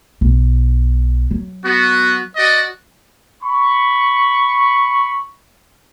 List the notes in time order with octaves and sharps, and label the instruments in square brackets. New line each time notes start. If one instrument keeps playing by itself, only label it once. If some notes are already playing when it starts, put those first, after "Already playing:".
[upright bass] B1
F#3
[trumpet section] B3 F#4
F#4 D5 D#5
B5 C#6